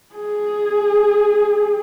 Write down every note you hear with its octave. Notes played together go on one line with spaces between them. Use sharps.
G#4